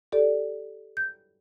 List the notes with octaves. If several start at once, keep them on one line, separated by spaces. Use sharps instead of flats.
G4 A4 D5
G6